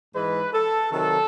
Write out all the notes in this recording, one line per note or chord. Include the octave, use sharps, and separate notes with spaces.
G#2 E3 G#3 B4
A4
C3 D#3 F#3 A4